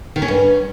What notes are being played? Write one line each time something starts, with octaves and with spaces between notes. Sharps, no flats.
D#3
C#4
G2